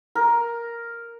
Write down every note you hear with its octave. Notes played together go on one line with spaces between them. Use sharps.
A#4